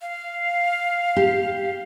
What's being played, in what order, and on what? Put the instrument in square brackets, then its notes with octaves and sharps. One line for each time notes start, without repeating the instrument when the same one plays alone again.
[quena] F5
[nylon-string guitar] G4